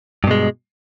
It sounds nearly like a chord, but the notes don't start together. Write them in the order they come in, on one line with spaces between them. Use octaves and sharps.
G2 B2 G#3